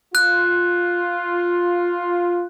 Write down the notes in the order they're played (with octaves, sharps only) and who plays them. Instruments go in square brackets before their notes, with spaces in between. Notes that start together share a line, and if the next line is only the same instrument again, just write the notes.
[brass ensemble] F4 [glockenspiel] F#6